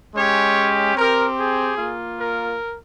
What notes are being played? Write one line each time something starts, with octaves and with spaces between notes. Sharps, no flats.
G#3 C#4 G4 C#5
C4 G4 A#4
G#4
A#3 F4
A#4